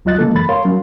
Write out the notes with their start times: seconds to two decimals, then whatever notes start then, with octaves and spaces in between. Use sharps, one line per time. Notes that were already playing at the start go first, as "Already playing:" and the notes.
0.05 D2 F#3 F4 D#5 F#6 A6
0.18 C#3 E3 G#3 A#3 A4
0.35 F#2 B5 A6
0.49 A#4 C#5 F5 C6
0.65 F#3 C#4